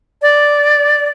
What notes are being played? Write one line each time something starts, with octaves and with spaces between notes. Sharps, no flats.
D5